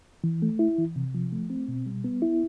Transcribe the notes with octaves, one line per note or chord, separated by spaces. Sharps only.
E3
A3
E4
E3
C3
F3
A3
C4
B2
G3
B3
E4